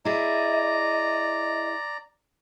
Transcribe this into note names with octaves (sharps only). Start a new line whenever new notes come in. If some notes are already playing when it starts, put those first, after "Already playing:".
E4 G#4 D5 D#5 A#5